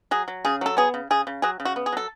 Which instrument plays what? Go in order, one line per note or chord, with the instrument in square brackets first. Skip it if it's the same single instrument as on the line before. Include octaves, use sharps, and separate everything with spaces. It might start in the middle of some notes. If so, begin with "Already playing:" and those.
[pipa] F#3 G#4
F#3
C#3 G#4
F#3 A4
B3 G#4
C#3
C#3 G#4
C#3
F#3 G#4
C#3
F#4
B3
G#4
F#3 A4